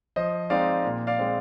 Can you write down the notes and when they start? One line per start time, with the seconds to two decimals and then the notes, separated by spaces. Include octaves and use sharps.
0.16 F3 C5 D#5
0.50 G#3 C4 D#4 D5 F5
0.85 A#2
1.07 D5 F5
1.19 G#3 C4